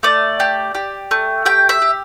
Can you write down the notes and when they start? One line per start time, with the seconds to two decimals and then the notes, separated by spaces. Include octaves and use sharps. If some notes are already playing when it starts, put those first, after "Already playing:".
0.03 A3 D5
0.40 G4
0.75 G4
1.11 A3
1.45 G4 G5
1.69 E5
1.82 G4